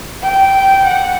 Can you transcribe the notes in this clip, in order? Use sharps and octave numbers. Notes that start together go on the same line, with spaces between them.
G5
F#5